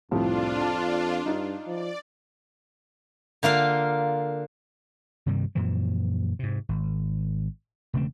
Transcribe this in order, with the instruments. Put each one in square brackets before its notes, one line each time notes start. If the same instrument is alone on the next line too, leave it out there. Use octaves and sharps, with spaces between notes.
[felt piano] C2 A2 F3 [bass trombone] F2 [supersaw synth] D4 F4
[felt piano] A5
[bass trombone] G2 [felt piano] D#4
[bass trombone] F3 [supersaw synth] D5
[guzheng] D3 A#3 F4 F5
[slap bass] G2 C3 D#3 G3
F#2 A#2 E3 F3
G#2 C3
G#1
E1 C#3 A3 C4